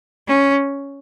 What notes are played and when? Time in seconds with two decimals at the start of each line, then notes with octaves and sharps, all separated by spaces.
0.27 C#4